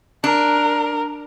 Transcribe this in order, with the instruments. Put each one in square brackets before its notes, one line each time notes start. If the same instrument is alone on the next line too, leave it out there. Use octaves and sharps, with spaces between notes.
[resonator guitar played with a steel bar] D4 [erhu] A#4